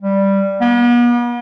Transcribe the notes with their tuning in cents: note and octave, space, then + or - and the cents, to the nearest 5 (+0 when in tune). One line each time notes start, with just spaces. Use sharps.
G3 +0
B3 -45